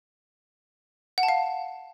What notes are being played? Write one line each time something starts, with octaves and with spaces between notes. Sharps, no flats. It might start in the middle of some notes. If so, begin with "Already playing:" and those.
F#5
A5
F5